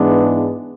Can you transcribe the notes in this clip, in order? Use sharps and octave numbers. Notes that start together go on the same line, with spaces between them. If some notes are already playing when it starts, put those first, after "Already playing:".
Already playing: G#2 E3 G#3 B3 D4